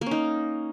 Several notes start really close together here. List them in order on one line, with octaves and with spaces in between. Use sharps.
A#3 C#4 D#4